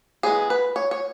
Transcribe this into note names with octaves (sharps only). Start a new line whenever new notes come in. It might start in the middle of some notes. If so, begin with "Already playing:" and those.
E3 G#3 B3 G#4
B4
C#5
C#5